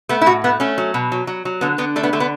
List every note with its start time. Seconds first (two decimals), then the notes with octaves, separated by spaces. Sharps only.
0.09 A3 B3
0.21 E4
0.26 A2 F#4
0.44 A3 B3
0.60 A3 C#4
0.78 F#3
0.94 B2
1.12 F#3
1.27 F#3
1.45 F#3
1.61 D3 B3
1.78 D3 B3
1.96 A3 D4
2.03 B3
2.13 D3 A3
2.20 B3